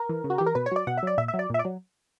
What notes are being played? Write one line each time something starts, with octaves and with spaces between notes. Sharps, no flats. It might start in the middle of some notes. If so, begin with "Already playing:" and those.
Already playing: A#4
E3
C#3
F#4
E3 G4
A#4
B2 B4
C#5
F#3 D5
B2 F#5
E5
F#3 D5
A#2 E5
E5
F#3
D5
A#2 E5
D5
F#3